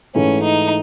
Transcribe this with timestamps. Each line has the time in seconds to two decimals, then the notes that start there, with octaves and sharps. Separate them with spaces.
0.15 G#2 E3 A3 C#4
0.43 D#4